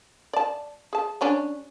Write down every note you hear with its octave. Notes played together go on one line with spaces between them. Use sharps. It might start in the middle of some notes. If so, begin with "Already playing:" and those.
D5 A5
G#4 A5
G3 C#4 D4